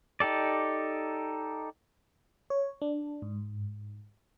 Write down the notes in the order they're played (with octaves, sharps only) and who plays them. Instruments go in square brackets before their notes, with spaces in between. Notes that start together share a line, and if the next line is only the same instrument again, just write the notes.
[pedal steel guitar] D#4 G4 A4 D5
[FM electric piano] C#5
D4
G#2